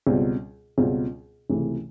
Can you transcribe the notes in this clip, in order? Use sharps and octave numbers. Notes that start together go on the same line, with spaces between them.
C#2 B2 G3 C4 F4
C#2 B2 G3 C4 F4
C#2 C3 E3 A3